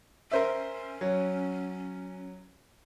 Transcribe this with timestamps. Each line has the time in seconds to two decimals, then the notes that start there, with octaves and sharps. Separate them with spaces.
0.32 C#4 A#4 C5 E5
1.01 F#3